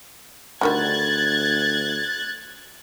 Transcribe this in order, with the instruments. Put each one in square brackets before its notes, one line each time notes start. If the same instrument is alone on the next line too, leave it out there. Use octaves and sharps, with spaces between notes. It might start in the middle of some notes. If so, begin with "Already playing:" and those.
[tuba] D2 [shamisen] D3 D#3 G3 [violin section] F#6 G#6 A6